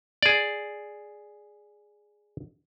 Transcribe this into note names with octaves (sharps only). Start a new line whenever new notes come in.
G#4 D5